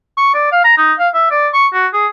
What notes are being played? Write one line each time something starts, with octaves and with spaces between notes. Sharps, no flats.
C#6
D5
F5
A#5
D#4
F5
E5
D5
C#6
F#4
G#4